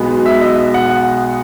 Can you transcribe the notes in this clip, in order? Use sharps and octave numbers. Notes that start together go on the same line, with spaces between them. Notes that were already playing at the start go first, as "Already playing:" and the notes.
Already playing: B1 B2 G#3 B3
E5
D#5
F#5